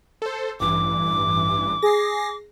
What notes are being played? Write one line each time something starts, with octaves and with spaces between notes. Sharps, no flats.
A4 C5
A1 G2 E3 D6
G#4 A#6 C7